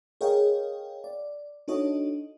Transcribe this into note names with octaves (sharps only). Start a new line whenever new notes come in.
G#4 A#4 C#5 D#5 F5 G5
D5
D4 D#4 F#4 A4 C#5 D#5